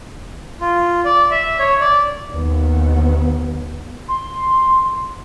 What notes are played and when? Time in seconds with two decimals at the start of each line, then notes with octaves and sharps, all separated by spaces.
0.61 F4
1.05 D5
1.31 E5
1.59 C#5
1.80 D5
2.30 D#2 B3
4.08 C6